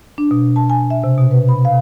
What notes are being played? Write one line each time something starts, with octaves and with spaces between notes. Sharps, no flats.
D4
B2
A5
G#5
E5
C3
B2
B4
B5
F5